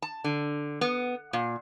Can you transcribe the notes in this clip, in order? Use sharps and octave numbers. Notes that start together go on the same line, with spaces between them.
A5
D3
B3
A#2